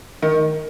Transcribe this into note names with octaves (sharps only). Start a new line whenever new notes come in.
D#3